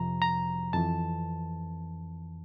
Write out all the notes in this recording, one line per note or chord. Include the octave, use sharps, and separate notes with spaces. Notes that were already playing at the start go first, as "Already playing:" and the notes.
Already playing: F2 C3 F3 A#5
A#5
F2 E3 A5